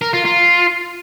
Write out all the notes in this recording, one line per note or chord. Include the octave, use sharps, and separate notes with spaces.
A#4
F4
F4